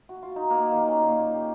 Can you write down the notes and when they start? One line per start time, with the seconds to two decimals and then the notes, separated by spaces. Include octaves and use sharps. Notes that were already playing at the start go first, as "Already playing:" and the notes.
0.09 F#4
0.23 F4
0.36 D#4
0.50 A#3
0.72 D#3
0.88 C#4
1.02 A#2
1.18 F4
1.34 G4